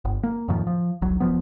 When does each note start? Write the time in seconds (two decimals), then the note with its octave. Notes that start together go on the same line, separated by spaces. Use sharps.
0.05 G1
0.23 A#3
0.48 F2 A2 D#3 F3
0.67 F3
1.02 D#1 A#1 F#3
1.20 D#1 A#1 F3 B3